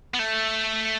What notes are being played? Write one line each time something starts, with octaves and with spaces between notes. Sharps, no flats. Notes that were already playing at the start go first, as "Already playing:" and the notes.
B3
A3